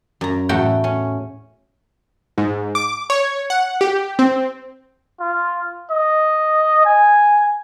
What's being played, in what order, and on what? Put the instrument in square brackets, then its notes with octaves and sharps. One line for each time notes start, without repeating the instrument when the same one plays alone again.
[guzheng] F#2 A#5
E2 A2 A3 F#4 G5
C#4
[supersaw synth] G#2
D6
C#5
F#5
G4
C4
[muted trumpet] F4
D#5
G#5